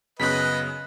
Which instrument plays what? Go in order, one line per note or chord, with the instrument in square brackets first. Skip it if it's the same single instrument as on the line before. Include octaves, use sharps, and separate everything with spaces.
[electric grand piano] F#2 C#3 B3 [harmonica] B4 D#5 [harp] F#6 B6